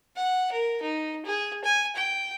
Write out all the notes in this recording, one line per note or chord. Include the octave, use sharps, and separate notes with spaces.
F#5
A#4
D#4
G#4
G#5
G5